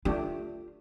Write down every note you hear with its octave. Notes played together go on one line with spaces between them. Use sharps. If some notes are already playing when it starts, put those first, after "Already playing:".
A3 D4 F4 G4